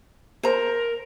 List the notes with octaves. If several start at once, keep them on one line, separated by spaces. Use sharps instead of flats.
A#4 C5 A#5